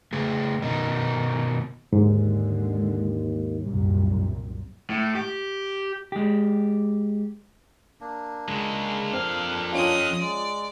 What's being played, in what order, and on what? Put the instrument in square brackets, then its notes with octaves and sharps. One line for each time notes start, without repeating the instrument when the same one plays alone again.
[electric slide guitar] C#3 A3 G#4
B2 D#3 D#4
[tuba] D#2 [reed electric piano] G#2 [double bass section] D3 G#3
[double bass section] C2 F#2 A#2 [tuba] G3
[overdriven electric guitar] A2
G4
[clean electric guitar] G#3 G4
[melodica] A#3 D4
[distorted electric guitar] C#3 G#3
[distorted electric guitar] F2 F5 [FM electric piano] C4
[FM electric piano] C#4 F4 [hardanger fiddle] D#5 D#6
[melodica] G#3 [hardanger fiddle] D5